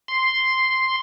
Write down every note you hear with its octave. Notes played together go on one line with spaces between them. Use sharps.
C6